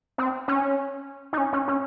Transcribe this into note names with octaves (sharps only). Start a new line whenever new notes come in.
C4
C#4
D#4
C#4
C#4
C#4